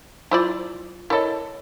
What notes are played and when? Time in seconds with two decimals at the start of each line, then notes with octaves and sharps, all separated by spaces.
0.31 F#3 E4 F4 C5 D5
1.10 E4 A4 A#4 C#5 D#5